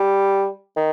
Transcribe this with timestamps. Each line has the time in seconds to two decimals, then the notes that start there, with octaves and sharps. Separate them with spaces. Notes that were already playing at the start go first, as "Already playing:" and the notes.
Already playing: G3
0.76 D#3